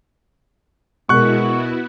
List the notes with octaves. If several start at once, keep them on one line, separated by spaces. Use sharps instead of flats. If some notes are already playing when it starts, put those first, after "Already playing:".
B2 G#3 B3 E4 F#4 A#4 C#6 F#6